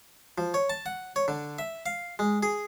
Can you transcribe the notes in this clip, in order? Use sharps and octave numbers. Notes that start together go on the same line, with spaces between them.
F3
C#5
A5
F#5
C#5
D3
E5
F5
G#3
G#4